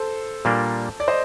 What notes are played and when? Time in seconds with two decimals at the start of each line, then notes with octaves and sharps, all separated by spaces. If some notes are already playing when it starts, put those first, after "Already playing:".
Already playing: A4 C5
0.45 A#2 G3 A#3 D4
1.00 D5
1.08 C5 D#5